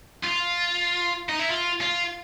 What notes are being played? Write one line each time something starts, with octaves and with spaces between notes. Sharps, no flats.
F4
D#4
E4
F4
F4